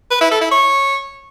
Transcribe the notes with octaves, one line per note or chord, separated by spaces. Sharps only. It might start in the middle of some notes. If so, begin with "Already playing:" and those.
B4
E4
A4
E4
C#5